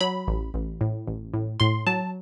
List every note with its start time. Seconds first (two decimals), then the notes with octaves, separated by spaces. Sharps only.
0.01 F#3 B5
0.28 A1
0.54 A1
0.81 A2
1.08 A1
1.34 A2
1.60 A2 C6
1.87 F#3 A5